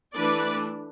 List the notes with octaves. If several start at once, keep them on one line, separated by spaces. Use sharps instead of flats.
E3 A3 D4 B4 D5